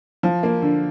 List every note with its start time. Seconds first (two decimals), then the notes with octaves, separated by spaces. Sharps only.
0.23 F3
0.43 A#3
0.62 D3